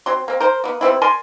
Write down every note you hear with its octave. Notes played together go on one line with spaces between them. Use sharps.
F#3 C4 C6
A#3 C4
A#4 C5
A#3 B3
G3 B3 C4 E4
A#4 D5 G#5 C6